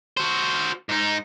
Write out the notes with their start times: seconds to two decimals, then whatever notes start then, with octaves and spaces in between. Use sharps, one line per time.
0.17 F#4 C5
0.89 G#2 D#4